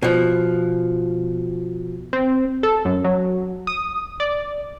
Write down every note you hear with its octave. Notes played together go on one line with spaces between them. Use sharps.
B2 F3
C4
A4
F#2
F#3
D#6
D5